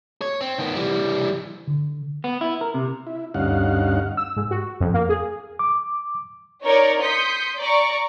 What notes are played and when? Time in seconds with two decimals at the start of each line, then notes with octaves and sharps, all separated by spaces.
0.21 C#5
0.41 C4
0.59 D#3 B3
0.76 E3 G3
1.68 D3
2.24 B3
2.41 E4
2.61 A#4
2.74 C3
3.07 E4
3.34 D2 G2 C#4 D#4 F5 F#5
4.17 E6
4.36 G#2
4.51 F#4
4.81 F2
4.94 A#3
5.09 G#4
5.59 D6
6.64 D#4 A#4 C#5 D5
7.02 C6 D#6 G6 B6 C#7
7.59 D5 A#5 C#6